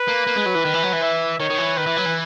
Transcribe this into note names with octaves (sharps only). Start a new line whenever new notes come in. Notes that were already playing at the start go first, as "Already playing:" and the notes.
Already playing: B4
A#3
A#3
G#3
F#3
E3
D#3
E3
F#3
E3
E5
D#3 C#5
D#3
E3
D#3 B4
E3
F#3
E3